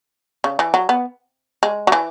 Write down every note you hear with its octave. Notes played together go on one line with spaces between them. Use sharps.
C#3
E3
F#3
B3
G#3
F#3
E3